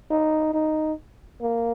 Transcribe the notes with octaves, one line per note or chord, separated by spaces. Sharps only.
D#4
D#4
A#3